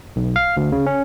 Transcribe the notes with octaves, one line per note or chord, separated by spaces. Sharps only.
B1
F5
D2
C#3
C#4